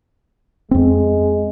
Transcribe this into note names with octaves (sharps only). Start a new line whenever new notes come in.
F2 G#3 C4